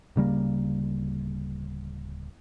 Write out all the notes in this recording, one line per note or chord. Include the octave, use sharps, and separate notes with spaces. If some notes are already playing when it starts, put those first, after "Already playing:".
D1 C#3 G3 A#3